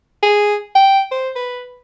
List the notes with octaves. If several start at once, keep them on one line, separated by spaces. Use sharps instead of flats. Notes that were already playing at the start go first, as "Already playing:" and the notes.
G#4
G5
C5
B4